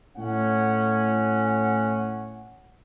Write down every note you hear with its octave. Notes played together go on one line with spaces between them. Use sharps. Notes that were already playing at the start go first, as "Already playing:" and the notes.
A2 C#4 F#5